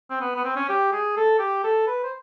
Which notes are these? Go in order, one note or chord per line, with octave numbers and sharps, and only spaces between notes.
C4
B3
B3
C4
C#4
G4
G#4
A4
G4
A4
B4
C5